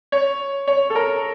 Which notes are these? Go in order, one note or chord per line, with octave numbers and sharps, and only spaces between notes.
C#5
C#5
A4
A#4